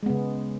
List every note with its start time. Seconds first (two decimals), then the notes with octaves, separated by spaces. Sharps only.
0.03 G#3
0.06 B3
0.10 C#3